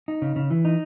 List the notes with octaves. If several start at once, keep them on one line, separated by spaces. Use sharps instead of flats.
D#4
C#3
C#3
E3
D#4